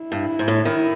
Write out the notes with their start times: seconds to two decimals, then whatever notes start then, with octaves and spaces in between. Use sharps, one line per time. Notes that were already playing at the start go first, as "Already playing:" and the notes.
Already playing: E4
0.12 G2
0.39 G#2
0.48 A2
0.65 D#3